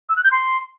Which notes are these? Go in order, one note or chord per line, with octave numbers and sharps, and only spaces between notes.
E6
F#6
G6
C6